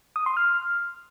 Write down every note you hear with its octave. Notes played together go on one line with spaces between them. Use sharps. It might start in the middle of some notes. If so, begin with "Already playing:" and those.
D#6
C6
F6